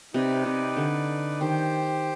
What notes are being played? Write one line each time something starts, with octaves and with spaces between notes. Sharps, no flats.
C3 D#4 B4 D5
C3
D3
D#3 G4 C5 G5